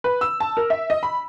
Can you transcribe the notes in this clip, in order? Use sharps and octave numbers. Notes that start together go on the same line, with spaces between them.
B4
E6
A5
A#4
E5
D#5
B5